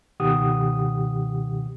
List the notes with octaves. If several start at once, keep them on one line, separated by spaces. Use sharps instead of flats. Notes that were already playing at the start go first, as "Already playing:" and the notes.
C#2 B2 D#3 G4 F#5 D#6